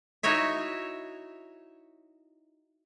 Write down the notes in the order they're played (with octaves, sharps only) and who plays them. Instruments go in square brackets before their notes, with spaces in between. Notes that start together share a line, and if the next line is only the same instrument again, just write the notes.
[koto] D#4 E4 F#4 C#5 E5